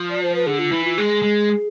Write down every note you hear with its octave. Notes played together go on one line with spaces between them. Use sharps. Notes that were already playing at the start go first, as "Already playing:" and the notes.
Already playing: F3
D5
C5
B4
D3 G#4
F4
E3 E4
F4
G#3 G#4
G#3